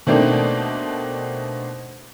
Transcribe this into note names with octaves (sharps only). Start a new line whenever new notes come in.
B2 A3 A#3 C4 D4 D#4